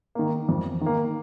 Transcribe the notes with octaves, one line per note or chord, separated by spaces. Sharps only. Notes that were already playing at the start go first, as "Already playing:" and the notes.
D#3 A#3
F2
D#3
A#3